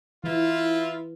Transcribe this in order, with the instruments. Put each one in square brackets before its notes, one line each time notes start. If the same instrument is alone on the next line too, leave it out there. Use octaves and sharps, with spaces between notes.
[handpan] E3 [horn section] E4 F4